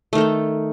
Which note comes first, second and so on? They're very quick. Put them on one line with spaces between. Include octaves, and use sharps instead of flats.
A3 D#3 A4 D#4